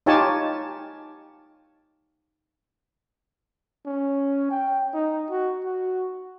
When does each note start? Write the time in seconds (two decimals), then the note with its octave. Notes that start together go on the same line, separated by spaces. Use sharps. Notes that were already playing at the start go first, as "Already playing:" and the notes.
0.06 D#4 F4 G4 C#5 G#5 A5
3.86 C#4
4.50 G5
4.93 D#4
5.31 F#4
5.64 F#4